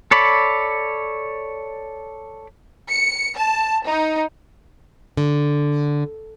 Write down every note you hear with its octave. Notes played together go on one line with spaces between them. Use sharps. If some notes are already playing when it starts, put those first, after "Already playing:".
A4 C#5 D5 B5
C#7
A5
D#4
D3